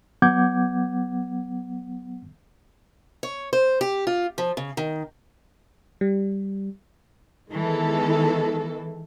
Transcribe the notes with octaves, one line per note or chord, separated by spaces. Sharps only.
F#3 B3 F#5 D6 G6 G#6
C#5
C5
G4
F4
F3
C#3
D#3
G3
D#3 E3 G#3 B3 A4